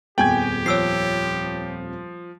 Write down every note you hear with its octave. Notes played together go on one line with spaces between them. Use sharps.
D#1 F2 B3 G4 G#4 G5 G#5 G#6
F3 C#5 E6 C7